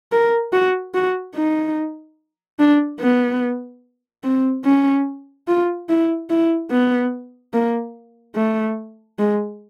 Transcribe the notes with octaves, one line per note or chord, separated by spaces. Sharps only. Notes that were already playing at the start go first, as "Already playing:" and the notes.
A#4
F#4
F#4
D#4
D4
B3
C4
C#4
F4
E4
E4
B3
A#3
A3
G#3